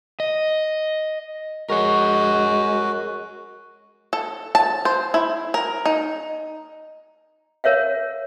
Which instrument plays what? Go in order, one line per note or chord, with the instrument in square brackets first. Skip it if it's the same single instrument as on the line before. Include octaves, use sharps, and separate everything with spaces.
[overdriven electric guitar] D#5
[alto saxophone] G#3 [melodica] F#4 [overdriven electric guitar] A#4 C#5
[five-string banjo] A4
A5
C5
E4
A#4
D#4
[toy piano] A#4 C#5 E5 F5